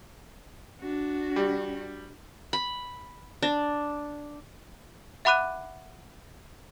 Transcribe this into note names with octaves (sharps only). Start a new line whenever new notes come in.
D4 F#4
G3
B5
D4
E5 F#5 B5 D6 F#6 D#7